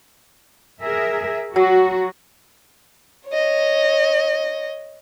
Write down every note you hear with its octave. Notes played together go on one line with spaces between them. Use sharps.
G#4 A#4 E5
F#3 F#4
C#5 D#5